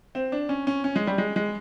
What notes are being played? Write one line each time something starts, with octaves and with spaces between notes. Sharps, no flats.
C4
D4
C#4
C#4
C#4
G#3
G3
G#3
G#3